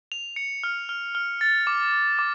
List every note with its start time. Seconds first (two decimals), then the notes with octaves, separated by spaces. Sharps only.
0.12 F7
0.36 C#7
0.64 F6
0.89 F6
1.15 F6
1.41 A6
1.67 D6
1.92 D6
2.19 D6